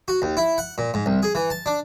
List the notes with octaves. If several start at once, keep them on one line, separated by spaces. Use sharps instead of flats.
F#4
D#2
E4
F#5
A#2
G#2
C2
G#4
E3
A5
D4